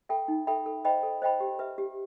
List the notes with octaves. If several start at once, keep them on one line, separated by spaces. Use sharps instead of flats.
A4 E5 G5 B5
D#4
A4 E5 G5 B5
A4
C5 D#5 G5 B5
A4
C5 D#5 G5 B5
G4
B4 E5
G4